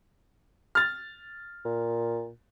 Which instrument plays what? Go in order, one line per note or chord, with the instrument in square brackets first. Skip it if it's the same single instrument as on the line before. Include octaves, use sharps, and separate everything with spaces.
[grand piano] F6 A6
[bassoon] A#2